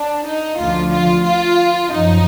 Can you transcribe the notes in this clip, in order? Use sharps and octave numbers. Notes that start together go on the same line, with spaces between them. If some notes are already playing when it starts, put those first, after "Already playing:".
Already playing: D4
D#4
D2 D3 F3 F4
F4
F4
F#2 F3 D#4